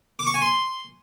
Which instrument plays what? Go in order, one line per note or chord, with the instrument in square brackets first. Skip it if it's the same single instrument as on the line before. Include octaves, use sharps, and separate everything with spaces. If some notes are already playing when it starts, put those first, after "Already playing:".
[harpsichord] D6
C#6
G#5
C6